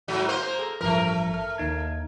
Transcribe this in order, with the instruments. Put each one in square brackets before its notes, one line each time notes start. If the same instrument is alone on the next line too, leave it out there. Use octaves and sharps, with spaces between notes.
[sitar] G#2 F#3
A#3 C5
[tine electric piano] G#4 A4 A#5
[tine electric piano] A1 G2 F3 [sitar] A3 A#4
[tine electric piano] F6
D#2 D#4 G#6